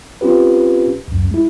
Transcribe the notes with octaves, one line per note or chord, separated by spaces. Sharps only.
C4 C#4 F4 G4 B4
C#2 F#2
G#3 E4